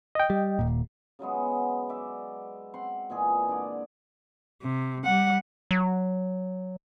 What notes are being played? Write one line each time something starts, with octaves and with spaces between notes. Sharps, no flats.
D#5 G5
G3
D#1 A#2
C#3 F#3 G#3 B3
D5 E5
C4 F#5 C6
A#2 E3 G#3 G#4
D3 D5
C3
G3 F#5
F#3